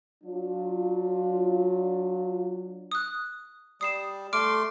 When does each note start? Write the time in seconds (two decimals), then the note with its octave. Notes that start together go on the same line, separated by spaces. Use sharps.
0.24 F#3 D4 F4
2.92 D#6 F#6
3.81 G3 D#6 C7 E7
4.33 A3 C6 D6 F6 D7